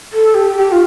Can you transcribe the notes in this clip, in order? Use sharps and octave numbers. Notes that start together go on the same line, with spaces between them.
A4
G4
G4
F4